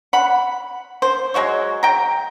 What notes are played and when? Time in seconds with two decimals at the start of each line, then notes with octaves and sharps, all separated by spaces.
0.13 F#5 B5
1.02 C5
1.34 F#3 G#3 F#4 C#5
1.83 G5 A#5